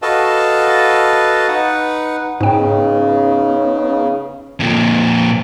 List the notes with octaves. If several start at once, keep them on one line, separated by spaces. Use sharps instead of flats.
F#4 A4 B4 D#5 F5 A5
D#4 B4 F#5
G#2 C#3 B3 C#4 D#4 G5
F2 A#2